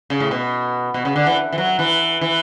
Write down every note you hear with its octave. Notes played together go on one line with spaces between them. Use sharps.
C#3
A2
B2
B2
C#3
D3
E3
E3
F#3
E3
E3